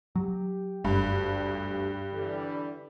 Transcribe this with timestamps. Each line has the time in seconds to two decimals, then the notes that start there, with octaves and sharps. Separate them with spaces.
0.15 F#3 G4
0.84 F#1 D2 G2
2.12 D3 E3 G3